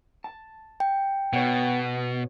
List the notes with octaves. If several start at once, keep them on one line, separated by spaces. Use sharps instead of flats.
A5
G5
B2 B3 C#5